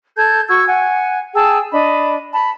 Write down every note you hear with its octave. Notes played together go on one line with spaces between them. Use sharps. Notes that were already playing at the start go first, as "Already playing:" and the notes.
A4 A5 G6 G#6
F#4 C#6 E6 G#6
F#5 G#5
G#4 G5 A5 E6
D4 D#5 B5
A5 B5